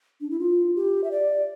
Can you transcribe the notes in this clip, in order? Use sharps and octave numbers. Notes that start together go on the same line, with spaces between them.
D4
E4
F4
G4
E5
D5